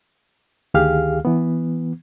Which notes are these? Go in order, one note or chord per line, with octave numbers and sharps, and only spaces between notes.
D2 D#3 G4 G#4 F5 F6
E3 B3